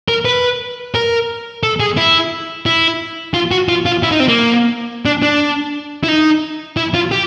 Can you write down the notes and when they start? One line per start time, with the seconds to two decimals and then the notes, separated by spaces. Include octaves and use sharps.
0.09 A#4
0.25 B4
0.95 A#4
1.63 A4
1.80 G#4
1.97 E4
2.66 E4
3.34 F4
3.51 F#4
3.69 F4
3.86 F4
4.03 E4
4.12 D#4
4.20 C4
4.28 A#3
5.05 D4
5.22 D4
6.04 E4
6.08 D#4
6.77 E4
6.94 F4
7.12 G4